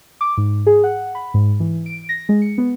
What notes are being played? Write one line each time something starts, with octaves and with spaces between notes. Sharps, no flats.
D6
G#2
G#4
F#5
B5
G#2
E3
D7
A#6
G#3
C#7
B3